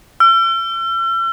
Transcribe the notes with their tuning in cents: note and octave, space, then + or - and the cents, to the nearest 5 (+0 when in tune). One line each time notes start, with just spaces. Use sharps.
E6 +45